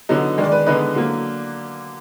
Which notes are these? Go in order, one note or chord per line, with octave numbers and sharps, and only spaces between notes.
D3 F#3 B3 D#4
D#3 G#3 D4
D5
B4
D3 G#3 B3 D#4 B4
D3 F#3 A#3